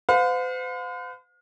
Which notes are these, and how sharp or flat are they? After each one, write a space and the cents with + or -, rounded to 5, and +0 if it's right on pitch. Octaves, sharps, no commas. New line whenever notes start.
C5 -45 F5 +40